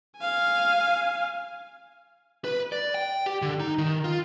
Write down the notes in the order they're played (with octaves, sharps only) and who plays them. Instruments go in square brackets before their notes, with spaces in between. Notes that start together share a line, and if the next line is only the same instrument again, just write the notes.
[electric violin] F5 G#5
[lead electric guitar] B4
D5
G5
G4
D3
D#4
D#3
F4